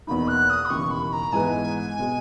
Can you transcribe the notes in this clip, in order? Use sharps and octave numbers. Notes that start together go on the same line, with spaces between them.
E2 B2 A#3 D#4 B5
F#6
D#6
B5
E1 D#2 C#3 E3 B3 C#6
B5
A#5
G#2 E3 G#3 B3 G#5
B2 G#3